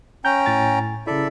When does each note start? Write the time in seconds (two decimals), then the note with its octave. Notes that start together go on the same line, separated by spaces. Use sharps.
0.25 C#4 G5 A#5 G6
0.46 A2 G#5 A6
1.07 C#3 E4 A4 D5 E5